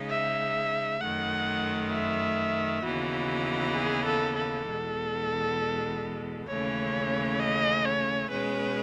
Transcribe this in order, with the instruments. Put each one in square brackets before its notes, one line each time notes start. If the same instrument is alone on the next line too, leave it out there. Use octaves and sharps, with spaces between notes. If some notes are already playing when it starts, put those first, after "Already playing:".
Already playing: [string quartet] C#3 G#3 D#4
[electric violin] E5
[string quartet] F#2 D#3 A3 [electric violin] F#5
[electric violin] E5
[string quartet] D#2 C#3 E3 B3 D#4 [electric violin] F#4
[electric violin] G#4
A4
A4
[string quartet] E2 B2 G#3
[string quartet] D#2 C#3 E3 A3 C#4 [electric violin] C#5
[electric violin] D#5
C#5
[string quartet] B2 G#3 C#4 [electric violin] B4